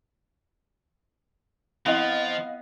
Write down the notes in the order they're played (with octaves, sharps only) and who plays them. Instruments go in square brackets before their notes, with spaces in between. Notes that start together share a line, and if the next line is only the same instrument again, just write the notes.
[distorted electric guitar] F3 [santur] B3 [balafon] C4 E4 G5 [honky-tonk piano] D#5 F5